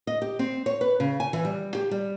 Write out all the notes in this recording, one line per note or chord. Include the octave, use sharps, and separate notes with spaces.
D#5
G4
C4
C#5
B4
C#3
G#5
E3
G3
G4
G3